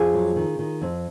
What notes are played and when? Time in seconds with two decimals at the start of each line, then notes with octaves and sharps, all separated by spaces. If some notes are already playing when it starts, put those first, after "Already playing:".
Already playing: F2 F4 G#4
0.14 F#3
0.36 D#3
0.59 D#3
0.82 F2